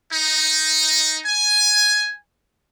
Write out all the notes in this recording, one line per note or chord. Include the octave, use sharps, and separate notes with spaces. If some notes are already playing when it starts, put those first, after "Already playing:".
D#4
G#5